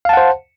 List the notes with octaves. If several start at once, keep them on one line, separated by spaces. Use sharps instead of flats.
C5 F5 F#5 A5